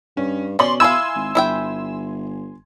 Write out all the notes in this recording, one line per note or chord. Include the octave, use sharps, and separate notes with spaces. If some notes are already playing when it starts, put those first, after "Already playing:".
G2 C#4
B2 C#4 D5 C6 F#7
E4 F5 G#5 C6 E6 G#6
G#1
G1 E4 E5 G5